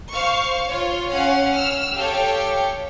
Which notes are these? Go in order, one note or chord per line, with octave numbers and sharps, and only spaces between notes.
C5 F5 C#6
F4 C#5
C#4 F5 F#5
E6 F6
G4 A4 C#5 F5 G5